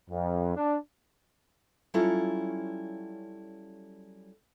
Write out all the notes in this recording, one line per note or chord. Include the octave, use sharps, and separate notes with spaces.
F2
D4
F#3 G3 C#4 E4 F4 A4